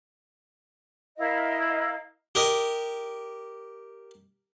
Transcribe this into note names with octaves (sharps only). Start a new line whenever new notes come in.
E4 A#4 D#5 F5
G4 A#4 D#5